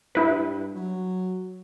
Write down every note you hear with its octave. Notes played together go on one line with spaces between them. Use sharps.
G2 E4 B4
F#3